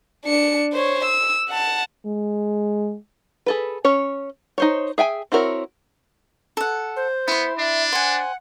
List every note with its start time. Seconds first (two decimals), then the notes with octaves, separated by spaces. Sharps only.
0.25 D4 C#7
0.73 C5 C#5
1.05 E6
1.49 F#5 A5
2.06 G#3
3.46 G#4 A4 B4
3.85 C#4 C#5
4.58 D#4 C5 C#5
4.98 G#4 E5 G5 G#5
5.32 C4 E4 F#4 A#4 C#5
6.57 A4 F#5
6.96 C5
7.28 B3 E4 C6
7.58 D4 E5
7.92 C5 F#5 G#5